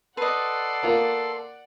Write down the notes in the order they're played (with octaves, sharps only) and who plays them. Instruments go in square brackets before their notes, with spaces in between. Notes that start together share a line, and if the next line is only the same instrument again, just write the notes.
[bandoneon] A4 C6 [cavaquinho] B4 D#5 [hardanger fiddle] D5 F#5
[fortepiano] A#3 F4